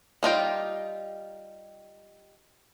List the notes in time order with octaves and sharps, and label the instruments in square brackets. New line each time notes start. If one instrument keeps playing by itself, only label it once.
[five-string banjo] G3 D#4 F4 G5